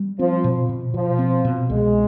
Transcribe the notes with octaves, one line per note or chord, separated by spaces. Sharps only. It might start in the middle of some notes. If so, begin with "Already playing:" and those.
Already playing: G3
F3 C4
B2
B2
B2 F3
C4
B2
C2 G#3